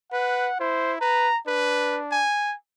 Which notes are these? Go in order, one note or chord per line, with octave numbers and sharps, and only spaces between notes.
B4 F#5
E4 C5
B4 A#5
D4 B4
G#5